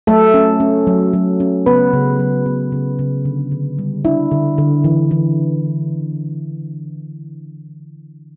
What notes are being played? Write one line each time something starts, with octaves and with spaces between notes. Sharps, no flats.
F#3 A3 A4
C#4
C#4
F#3
F#3
C#4
C#3 B3 B4
C#3
F#3
B3
C#3
C#3
D3
D3
G3
D4 E4
D3
D3
E3
E3